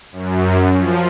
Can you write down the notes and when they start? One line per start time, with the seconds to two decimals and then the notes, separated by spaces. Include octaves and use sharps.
0.12 F#2
0.76 F3